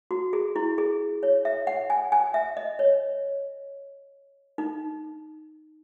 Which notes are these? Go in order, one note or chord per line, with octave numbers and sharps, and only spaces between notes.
F#4
G#4
E4
G#4
C#5
E5
F#5
G#5
G#5
E5
D#5
C#5
D#4